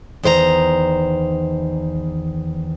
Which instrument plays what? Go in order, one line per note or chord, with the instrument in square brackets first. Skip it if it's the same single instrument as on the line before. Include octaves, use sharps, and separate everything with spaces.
[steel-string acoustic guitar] E2 D#3 C5 C#5 A#5